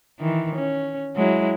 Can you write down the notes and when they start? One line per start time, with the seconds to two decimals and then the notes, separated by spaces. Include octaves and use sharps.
0.20 D#3 E3
0.55 C#4
1.16 F#3 G#3 E4